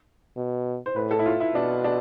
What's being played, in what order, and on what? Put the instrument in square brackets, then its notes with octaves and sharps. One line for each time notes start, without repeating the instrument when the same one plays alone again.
[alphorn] B2
[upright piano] C5
[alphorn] A2 [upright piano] B4
[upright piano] A4
E4
F4
E4
[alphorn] B2 [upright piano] D4
[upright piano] D4